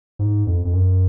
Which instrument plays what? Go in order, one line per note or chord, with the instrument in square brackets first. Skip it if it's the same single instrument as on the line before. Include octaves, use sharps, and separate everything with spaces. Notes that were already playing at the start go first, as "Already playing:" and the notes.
[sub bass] G#2
F2
F2
F#2